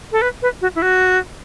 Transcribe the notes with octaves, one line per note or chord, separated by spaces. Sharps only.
A4
B4
B4
F#4
E4
F#4